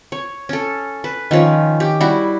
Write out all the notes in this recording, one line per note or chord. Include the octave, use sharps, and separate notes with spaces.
C#5
C#4 A4
B4
D#3 F3 C#4
G4
G3 E4 F#4